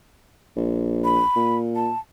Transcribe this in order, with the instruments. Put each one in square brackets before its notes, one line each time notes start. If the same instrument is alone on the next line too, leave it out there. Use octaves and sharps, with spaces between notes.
[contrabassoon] A#1
[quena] B5
[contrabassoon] A#2
[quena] A5